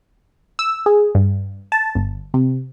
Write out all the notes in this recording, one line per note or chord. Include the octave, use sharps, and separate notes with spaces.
E6
G#4
G2
A5
G1
C3